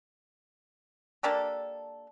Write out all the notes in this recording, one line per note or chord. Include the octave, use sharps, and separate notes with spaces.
A#3 D4 G4 A4